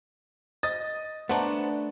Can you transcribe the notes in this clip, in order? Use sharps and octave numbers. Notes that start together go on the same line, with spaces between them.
D#5 D#6 A6
A3 B3 D4 C5 F#5 A5 A#5